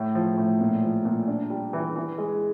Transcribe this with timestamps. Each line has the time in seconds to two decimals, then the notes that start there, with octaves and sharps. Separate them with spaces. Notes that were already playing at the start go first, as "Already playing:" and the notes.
Already playing: A2
0.15 F3
0.38 A2
0.61 A#2
0.83 F3
1.05 A#2
1.28 D4
1.50 G3
1.73 E3
1.96 E3
2.18 G#3